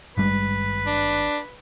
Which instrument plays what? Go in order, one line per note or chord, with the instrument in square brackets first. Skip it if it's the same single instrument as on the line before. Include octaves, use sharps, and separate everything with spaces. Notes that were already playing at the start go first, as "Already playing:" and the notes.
[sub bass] G#1 [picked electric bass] G2 G3 G#3 [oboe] B4
[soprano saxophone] D4